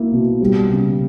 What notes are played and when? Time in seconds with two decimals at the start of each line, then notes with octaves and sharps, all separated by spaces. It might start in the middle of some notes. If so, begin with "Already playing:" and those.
Already playing: A#3 E4
0.11 B2
0.41 G3
0.70 C#3